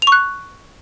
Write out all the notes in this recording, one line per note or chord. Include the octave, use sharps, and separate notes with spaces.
C#6 F#6 F7